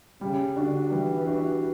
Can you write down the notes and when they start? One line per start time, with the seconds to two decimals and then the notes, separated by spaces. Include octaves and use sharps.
0.21 C#3 G3
0.56 D3 D4 F#4
0.91 E3 G3
1.27 D4 F#4